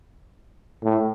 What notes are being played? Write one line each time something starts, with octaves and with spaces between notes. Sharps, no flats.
A2